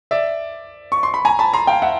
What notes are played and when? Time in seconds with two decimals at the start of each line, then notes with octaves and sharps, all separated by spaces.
0.11 D5 E5
0.92 C#6
1.03 C6
1.14 B5
1.25 G#5 A#5
1.39 A5 B5
1.53 A#5 C6
1.67 F5 G5
1.82 E5 F#5